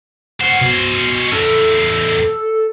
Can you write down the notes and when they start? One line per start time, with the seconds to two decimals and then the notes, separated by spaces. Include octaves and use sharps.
0.41 C#4 C5 F#5
0.61 B2
1.32 E2 A2 A4